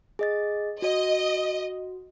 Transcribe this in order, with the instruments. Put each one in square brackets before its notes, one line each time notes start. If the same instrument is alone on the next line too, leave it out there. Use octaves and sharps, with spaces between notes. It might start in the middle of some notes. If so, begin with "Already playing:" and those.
[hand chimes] G#4 D#5 A6
[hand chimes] F#4 [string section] D#5